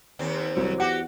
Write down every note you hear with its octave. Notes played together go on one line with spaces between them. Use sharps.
D#2 C4
C2 F#3
E2 F#4 G4 F#5